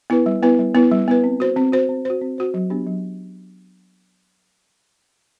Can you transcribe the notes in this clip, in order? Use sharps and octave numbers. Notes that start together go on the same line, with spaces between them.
B3 E4 B4
G3
B3 E4 B4
G3
B3 E4 B4
G3
B3 E4 B4
C4
F#4 C5
C4
F#4 C5
C4
F#4 C5
C4
F#4 C5
F#3
B3 D4 G4
F#3